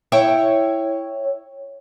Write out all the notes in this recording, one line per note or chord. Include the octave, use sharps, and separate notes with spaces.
E4 C#5 G5